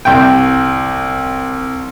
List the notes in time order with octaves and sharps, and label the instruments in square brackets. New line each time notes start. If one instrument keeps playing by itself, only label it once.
[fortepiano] C2 G5